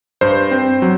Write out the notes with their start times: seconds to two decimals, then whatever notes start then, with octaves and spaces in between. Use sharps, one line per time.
0.21 G2 C5
0.51 C4
0.82 F#3